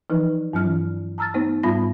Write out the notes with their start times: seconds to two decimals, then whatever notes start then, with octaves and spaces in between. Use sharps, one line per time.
0.10 E3 F3 D#4 B4
0.53 G2 F#3 C#4 F6
0.65 E3
1.18 A5 A#5 E6 F6 A6
1.34 A3 B3 D#4 C5
1.63 G#2 G3 B3 F4 B5 A#6